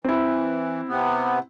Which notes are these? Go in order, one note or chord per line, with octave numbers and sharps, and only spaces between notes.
E3 C4 E4
C3 B3